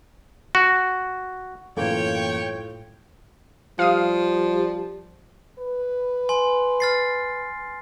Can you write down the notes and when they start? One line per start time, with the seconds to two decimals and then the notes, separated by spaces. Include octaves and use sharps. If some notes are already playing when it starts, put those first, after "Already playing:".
0.55 F#4
1.77 F#2 A2 E3 A#3 F4 A4 C#5 G5
3.79 F3 G3 F5 D#6
5.59 B4
6.29 G#5 C6
6.80 F6 A6 C7